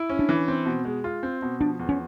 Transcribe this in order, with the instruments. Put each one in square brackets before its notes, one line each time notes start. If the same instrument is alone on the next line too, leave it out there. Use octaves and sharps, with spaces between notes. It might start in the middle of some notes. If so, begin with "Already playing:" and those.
Already playing: [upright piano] E4
C#4
[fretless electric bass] D4
[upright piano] E3
C4
B2
G#3
F4
C4
B2
[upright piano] F3 [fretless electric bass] D4
[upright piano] E2
[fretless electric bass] C#4